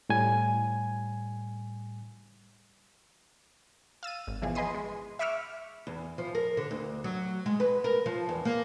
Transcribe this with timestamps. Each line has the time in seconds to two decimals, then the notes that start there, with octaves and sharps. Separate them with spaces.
0.09 A2 G3 G#5 G#6
4.03 F5 E6 A6 D#7
4.27 G#1
4.42 B2 E3 F3 G#4
4.55 B4 D#5 G#5 B5 C6 D#6
4.74 G#3
5.19 E5 B5 C#6 D6 E6 F6
5.87 E2
6.18 F3
6.35 A#4
6.57 D3
6.71 D2
7.04 F#3
7.46 G#3
7.60 B4
7.84 A#4
8.06 F3
8.29 E2
8.45 A#3